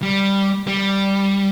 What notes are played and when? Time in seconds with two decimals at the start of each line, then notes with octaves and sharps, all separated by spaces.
0.02 G3
0.67 G3